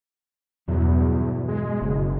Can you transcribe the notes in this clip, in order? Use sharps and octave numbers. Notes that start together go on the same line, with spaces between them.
E2 G2 B2 F#3
G#3
F#1